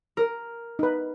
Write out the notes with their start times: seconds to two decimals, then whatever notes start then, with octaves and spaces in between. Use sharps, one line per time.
0.17 A#4
0.79 D#4 B4